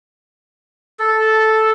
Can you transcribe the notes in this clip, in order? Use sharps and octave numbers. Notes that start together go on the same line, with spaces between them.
A4